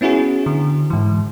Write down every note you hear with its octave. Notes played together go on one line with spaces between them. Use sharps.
B3 C#4 E4 F#4 G#4
D3
G#2 E3